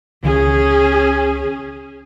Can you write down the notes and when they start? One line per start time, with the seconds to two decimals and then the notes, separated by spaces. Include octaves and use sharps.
0.24 C#2 D#3 C#4 G#4